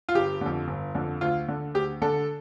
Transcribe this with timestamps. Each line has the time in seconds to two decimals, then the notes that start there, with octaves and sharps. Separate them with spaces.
0.09 F4
0.15 G1 G4
0.41 F2 D3
0.68 G1
0.95 F2 D3
1.21 D2 F4
1.48 D3
1.74 D2 G4
2.02 D3 A4